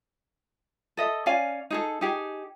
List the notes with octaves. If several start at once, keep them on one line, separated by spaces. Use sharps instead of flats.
A4 D#5 E5
C#4 D5 F5 G#5
D#4 G#4 A4
D#4 G4 G#4